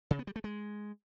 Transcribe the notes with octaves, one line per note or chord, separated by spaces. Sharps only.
C#3
B3
G3
A3
G#3